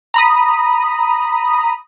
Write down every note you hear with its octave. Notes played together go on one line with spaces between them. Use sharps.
A#5 B5 D#6